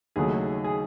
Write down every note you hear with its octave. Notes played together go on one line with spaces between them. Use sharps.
D#2 C#3 F#3 A3 G#4
G#4